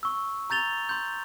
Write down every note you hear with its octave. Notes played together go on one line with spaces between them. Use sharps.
C#6 E6
A#5 G6 A6 F7 G7
C6 G6